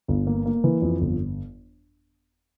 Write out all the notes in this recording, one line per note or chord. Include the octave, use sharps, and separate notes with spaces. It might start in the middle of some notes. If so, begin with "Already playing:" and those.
G1
A#3
A#3
E3
F2
G1